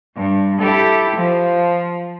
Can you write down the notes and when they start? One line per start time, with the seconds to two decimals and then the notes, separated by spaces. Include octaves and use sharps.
0.16 G2
0.61 E4 G4 A4
1.17 F3